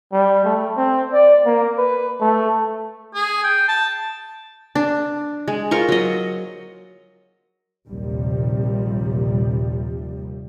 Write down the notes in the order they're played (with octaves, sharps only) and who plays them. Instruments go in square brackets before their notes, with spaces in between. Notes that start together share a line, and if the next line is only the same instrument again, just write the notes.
[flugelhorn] G3
A3
C4
D5
A#3
B4
A3
[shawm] G#4
G5
A5
[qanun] D4
G#3
F4 A#4 C5 C#6
F#3 D#5
[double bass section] A#1 D#2 C3 F3 G3